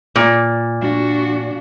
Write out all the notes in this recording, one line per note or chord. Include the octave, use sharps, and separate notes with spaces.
A#2
D4 F#4